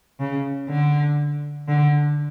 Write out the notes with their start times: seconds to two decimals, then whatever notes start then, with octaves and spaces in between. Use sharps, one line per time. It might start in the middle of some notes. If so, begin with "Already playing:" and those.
0.20 C#3
0.69 D3
1.68 D3